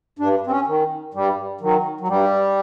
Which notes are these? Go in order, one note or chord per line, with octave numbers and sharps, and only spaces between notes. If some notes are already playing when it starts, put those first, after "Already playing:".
G2 D4
C4
C#4
D#3
G2 G3
D#3 F#3
F#3
G2 G3